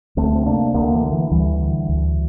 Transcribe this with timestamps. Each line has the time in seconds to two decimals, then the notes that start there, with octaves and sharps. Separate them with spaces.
0.17 D2 A3 C4
0.35 C4
0.46 C3 A#3 D4
0.74 D2 A#3 D4
0.93 E3
1.03 D3
1.13 E3
1.31 D2 E3 G3
1.61 D3
1.89 D2